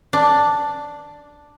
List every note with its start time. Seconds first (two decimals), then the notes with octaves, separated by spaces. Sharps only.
0.13 D4